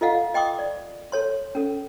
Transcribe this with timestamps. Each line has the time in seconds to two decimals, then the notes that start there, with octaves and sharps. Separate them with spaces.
0.01 F4 A4 D#5 F5 F#5
0.34 D#5 G5 C6 D6 D#6
0.59 D5
1.12 A4 C#5 C6
1.55 C#4 A4